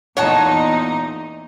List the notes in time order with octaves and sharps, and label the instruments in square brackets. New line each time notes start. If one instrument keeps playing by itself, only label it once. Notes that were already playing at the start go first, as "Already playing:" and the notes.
[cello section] E2 A#2 D#4 [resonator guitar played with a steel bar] C#5 F#5 A5